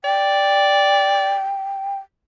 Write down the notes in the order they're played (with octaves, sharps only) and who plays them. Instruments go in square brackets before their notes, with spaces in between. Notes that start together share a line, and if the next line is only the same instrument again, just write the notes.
[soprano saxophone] D5 [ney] G5